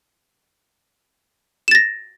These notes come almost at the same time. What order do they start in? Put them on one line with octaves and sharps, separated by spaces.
E7 A6 A#6